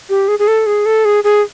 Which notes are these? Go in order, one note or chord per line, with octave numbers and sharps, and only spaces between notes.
G4
G#4
G#4
A4
G#4
A4
G#4
G#4